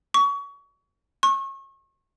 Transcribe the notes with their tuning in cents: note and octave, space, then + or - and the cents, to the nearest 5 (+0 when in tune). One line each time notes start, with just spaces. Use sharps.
C#6 +30
C#6 -35